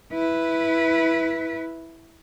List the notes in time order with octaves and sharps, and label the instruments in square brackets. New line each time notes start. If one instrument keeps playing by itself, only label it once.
[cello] E4 B4